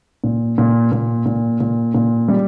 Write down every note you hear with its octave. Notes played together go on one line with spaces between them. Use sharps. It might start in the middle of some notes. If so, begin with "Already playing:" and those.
A#2
A#2
A#2
A#2
A#2
A#2
G3